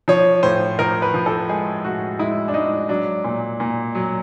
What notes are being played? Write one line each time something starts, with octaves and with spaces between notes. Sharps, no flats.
F3 C#5
A2 C5
F3 A#4
B4
F3
A4
G#3 G#4
A2 F#4
G#3 E4
D4
G#3 D#4
F#3 D4
A#2
A#2
F#3